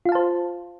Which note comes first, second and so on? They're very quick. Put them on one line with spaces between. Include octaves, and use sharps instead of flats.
F4 F5 A5 C5